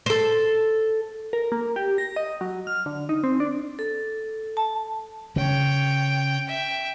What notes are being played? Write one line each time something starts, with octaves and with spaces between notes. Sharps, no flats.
A4 C5
A#4
A#3
G4
A#6
D#5
F#3
F6
D3
D#4
C4
D4
A4
A5
C#3 C#5 G5
E5 G5